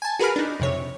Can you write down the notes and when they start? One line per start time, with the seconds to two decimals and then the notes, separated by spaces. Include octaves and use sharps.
0.02 G#5 A5
0.19 F#4 G#4 A#4 B4 B5 F6
0.36 D4 D#4
0.60 F2 C3 C#5